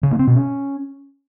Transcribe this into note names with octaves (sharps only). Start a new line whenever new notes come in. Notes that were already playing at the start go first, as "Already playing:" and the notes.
C#3
A#3
C4
B2
C#4